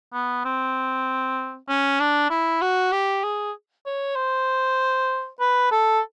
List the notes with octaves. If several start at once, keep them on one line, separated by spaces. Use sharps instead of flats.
B3
C4
C#4
D4
E4
F#4
G4
G#4
C#5
C5
B4
A4